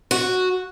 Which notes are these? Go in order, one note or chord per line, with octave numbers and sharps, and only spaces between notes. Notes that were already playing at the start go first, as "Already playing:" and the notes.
F#4